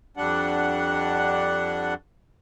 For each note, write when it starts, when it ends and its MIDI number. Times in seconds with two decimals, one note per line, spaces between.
0.17 1.94 41
0.17 1.94 55
0.17 1.94 62
0.17 1.94 78